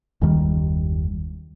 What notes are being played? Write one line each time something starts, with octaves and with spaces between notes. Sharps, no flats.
F#1 D#2 D#3 G3